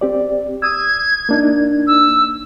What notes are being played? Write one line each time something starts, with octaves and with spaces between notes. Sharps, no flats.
C4 G4 D5
D#6 E6 G#6
A#3 D4 D#4
E6